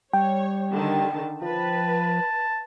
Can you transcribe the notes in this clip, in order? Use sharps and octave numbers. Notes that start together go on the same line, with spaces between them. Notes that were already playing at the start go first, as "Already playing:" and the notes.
G3 C#5 G5
D3 D#3 A5
F3 B4 A5